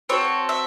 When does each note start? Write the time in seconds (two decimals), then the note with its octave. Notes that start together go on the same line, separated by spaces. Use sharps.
0.09 C4 F#4 A4 C#5
0.49 E5